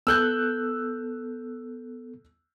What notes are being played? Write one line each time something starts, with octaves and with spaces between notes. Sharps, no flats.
B3 A4 E6 F#6 G6